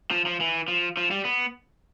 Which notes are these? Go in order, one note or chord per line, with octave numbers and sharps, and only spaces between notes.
F3
F3
E3
F3
F3
G3
B3